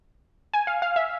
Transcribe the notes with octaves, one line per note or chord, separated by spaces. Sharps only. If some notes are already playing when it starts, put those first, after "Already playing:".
G#5
F5
F5
E5